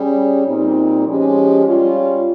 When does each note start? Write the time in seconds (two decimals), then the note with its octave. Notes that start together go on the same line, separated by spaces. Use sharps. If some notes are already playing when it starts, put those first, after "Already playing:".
Already playing: G3 C#4 G#4
0.46 A#2 G3 C4 D#4
1.06 F3 G#3 C#4 G4
1.65 G3 C#4 F4